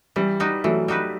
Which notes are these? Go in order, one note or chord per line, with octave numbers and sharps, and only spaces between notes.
E3 G3
G3 D#4 F#4 B4
E3 F#3 A3
G3 D#4 F#4 B4